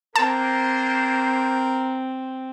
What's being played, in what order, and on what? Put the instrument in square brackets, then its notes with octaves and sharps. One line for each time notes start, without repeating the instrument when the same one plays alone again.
[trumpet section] A#3 D4 C5 [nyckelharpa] C4 [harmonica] A#4 [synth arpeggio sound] A5